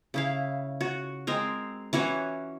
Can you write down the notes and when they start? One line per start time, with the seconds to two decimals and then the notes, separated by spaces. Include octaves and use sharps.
0.14 C#3 E4 F5
0.81 F#4
1.27 G#3 C4 A#4
1.93 E3 C#4 F#4 C#5